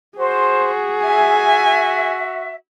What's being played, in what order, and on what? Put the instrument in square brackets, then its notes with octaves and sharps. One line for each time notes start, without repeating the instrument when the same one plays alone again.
[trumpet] F#4 [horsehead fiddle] G#4 [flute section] C5
[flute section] E5 [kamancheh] G#5